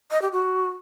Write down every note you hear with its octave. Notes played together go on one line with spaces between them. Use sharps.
D#5
G4
F#4